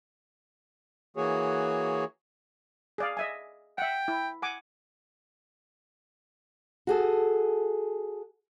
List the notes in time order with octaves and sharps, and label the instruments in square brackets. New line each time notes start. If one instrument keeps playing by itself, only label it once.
[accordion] E3 A#3 F#4 G#4 C#5
[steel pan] G#4 D5 F5
D#5 E5 G#5
[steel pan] E5 F#5 [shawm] G5
[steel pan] E4
F#5 G#5 D6
[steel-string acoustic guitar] F#4 G#4 A4